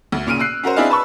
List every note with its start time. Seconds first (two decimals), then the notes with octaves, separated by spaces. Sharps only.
0.12 D2
0.27 A#2 C#3 F6 D7 D#7
0.39 E6 F#6 C7
0.63 C#4 F#4 A#4 C5
0.76 C4 D4 E4 G#4 D#5 F5
0.90 B4 A5 B5 C#6 E6